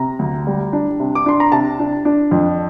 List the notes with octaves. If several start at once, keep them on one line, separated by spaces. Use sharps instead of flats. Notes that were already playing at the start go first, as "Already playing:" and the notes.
Already playing: C3 A#5
D2
G3
D4
C3
D6
D4 C6
A#5
C3 A5
D4
D4
F2